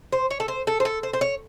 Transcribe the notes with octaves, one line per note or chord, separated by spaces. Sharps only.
C5
C#5
A4
C5
A4
C5
A4
C5
C5
C#5